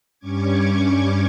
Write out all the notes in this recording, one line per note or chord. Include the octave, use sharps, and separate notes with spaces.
G2 G3 C#4 C#6 D6 G#6